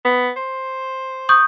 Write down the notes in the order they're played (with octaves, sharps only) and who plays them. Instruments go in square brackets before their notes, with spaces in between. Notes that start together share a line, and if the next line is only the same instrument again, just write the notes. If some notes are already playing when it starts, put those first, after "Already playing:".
[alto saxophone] B3
C5
[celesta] C#6 D#6 G6